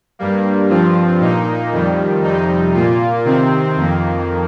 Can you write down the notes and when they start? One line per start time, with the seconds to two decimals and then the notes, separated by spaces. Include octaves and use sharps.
0.19 G2 G3 A#3
0.70 G2 F3 C4 F4
1.20 A#2 A#3 D#4
1.72 F2 D#3 G3
2.24 F2 C3 G3 D#4
2.74 A#2 A#3 F4
3.25 C3 D#3 C4
3.76 F2 D#3 A#3